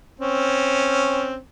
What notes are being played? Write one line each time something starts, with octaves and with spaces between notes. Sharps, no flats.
C4 C#4